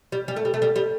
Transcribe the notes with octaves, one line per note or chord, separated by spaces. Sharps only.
G3
G3
A3
G3
A3
G3
G3